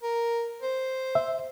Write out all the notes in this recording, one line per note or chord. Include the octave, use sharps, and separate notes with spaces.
A#4
C5
E5